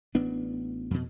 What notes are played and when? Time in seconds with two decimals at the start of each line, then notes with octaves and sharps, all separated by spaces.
0.15 A1 B3 D4
0.91 F2 B2